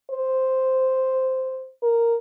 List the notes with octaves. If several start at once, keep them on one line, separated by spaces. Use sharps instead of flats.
C5
A#4